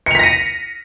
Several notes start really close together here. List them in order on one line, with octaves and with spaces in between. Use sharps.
C#7 F7 B6 A#6 D#7